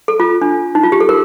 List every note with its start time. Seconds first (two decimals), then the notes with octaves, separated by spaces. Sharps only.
0.08 A4
0.20 F4
0.42 D4
0.75 D#4
0.83 F4
0.92 G4
1.00 A4
1.09 A#4